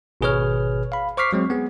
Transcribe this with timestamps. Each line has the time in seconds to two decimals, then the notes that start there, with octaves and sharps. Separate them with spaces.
0.21 G#1 B2 G#4 B4 C#5 F6
0.92 F5 B5
1.17 C5 C#6 D6 F6 B6 C7
1.33 F#3 G#3 C4
1.50 B3 G#4